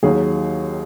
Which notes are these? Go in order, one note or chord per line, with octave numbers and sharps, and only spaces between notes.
D#2 D#3 F#3 G#4